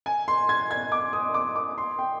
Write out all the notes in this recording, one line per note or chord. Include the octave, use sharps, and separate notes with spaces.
G#5
C6
G#6
G#6
D6
D#6
D6
D6
C6
G5